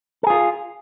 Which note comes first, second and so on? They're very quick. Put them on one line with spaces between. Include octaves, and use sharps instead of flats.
A4 G#4 F4